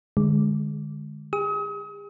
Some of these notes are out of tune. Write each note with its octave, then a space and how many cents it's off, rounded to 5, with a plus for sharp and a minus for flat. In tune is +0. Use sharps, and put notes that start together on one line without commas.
D3 +30 G#3 +0
G#4 -40 D#6 +40